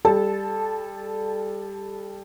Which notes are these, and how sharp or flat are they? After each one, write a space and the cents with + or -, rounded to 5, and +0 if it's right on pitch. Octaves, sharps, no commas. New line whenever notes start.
G3 +15 A4 -15 A5 +0